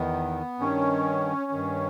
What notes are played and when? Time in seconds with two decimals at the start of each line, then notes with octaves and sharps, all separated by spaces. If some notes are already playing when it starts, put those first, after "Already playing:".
Already playing: E2 D#3 B3
0.59 G2 D#3 C#4
1.51 G2 D#3